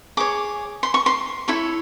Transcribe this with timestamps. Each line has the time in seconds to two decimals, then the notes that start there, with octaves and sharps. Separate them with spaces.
0.17 G#4 C#5 D6
0.83 C6
0.94 C#6
1.06 C6
1.48 E4 A4 C#5